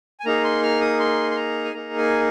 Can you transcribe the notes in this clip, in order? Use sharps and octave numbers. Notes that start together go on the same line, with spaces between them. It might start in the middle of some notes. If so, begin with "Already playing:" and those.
G#5
A#3 D#4 G#4 A#5
C6
F6
D#6
C6
C6
A#5
G#5
A#3 D#4 G#4 A#5
G#5